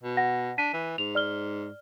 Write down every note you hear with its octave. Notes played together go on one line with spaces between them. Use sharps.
B2
F#5 A#6
D4 B6 D#7
E3
G#2 F7
D5 F6 G7